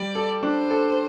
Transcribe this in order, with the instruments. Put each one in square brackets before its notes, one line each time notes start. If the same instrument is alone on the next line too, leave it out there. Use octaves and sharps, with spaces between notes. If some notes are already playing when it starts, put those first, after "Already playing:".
Already playing: [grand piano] G3 [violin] D5
[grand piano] A4
[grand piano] D4 [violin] C5
[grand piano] A4